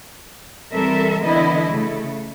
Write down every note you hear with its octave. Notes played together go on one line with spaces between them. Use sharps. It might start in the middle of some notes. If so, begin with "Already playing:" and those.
E3 G3 C4 A4 A#4 E5
D3 E3 B3 E4 D#5
C#3 A3